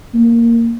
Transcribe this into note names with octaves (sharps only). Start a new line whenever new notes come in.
A#3